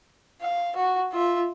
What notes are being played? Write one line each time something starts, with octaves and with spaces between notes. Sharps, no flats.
F5
F#4
F4 E5